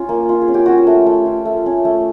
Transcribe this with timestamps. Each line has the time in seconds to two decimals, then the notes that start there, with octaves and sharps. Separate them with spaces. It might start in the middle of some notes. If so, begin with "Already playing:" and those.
Already playing: C#4 F4
0.09 A#3
0.29 F4
0.41 G#4
0.48 C#4
0.54 G4
0.66 C#4 F#4
0.78 G4
0.87 A3
1.06 A3
1.26 F4
1.45 A3
1.66 C#4
1.85 A3